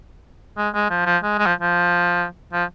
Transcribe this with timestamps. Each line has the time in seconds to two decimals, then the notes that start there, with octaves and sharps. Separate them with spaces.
0.57 G#3
0.74 G#3
0.90 F3
1.06 F3
1.23 G#3
1.39 G#3
1.46 F3
1.61 F3
2.53 F3